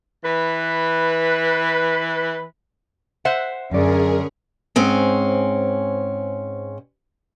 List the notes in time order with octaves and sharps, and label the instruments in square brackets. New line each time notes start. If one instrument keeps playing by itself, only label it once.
[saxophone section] E3 B4
[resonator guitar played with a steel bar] C5 E5 F#5
[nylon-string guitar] F#2 D5 [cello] D3 C#4 [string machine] G#4 A#4
[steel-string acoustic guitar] G#2 C4 C#4